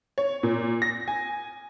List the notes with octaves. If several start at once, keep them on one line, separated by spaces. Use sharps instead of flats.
C#5
A#2
A#6
G#5